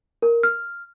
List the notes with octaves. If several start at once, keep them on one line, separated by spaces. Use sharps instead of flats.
A#4
F6